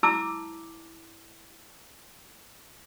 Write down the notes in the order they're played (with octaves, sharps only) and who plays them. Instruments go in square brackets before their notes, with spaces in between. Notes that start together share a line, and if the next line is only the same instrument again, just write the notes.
[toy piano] E4 A5 D6 E6